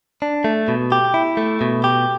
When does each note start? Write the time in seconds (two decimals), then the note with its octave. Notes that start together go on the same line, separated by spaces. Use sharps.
0.22 D4
0.44 A3
0.68 B2
0.92 G4
1.14 E4
1.37 A3
1.61 B2
1.84 G4